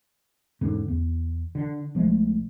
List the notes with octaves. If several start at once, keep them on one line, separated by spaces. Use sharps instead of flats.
E1 G#2 D3 C#4
E2
D3
B1 F3 G#3 A3